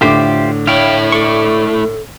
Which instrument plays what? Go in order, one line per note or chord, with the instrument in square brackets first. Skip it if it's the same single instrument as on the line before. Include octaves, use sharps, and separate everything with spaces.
[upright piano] A2 D3 D6 [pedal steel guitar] F4 G4 C5 [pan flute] E5
[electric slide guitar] A3 E4 [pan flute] C#5 [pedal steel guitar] F5 G5
[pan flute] A4 [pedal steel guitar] D5 C#6